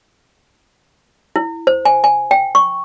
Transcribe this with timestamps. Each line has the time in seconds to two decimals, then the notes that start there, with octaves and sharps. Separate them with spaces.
1.36 E4
1.67 C5
1.85 G#5
2.04 G#5
2.31 G5
2.55 C#6